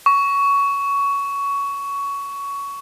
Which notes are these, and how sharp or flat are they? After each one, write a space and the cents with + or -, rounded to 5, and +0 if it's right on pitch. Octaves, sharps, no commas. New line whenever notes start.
C#6 +15